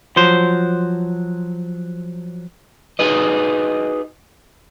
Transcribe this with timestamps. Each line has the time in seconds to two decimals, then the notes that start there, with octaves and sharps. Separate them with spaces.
0.16 F3 F#3 C5
2.99 D#4 F#4 G#4 B4 D#5